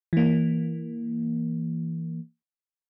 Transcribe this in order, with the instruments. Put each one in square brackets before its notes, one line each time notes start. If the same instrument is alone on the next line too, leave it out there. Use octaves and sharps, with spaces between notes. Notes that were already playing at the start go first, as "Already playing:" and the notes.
[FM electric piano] E3 A#3